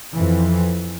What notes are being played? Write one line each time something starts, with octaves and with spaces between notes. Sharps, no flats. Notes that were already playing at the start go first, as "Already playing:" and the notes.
F2 E3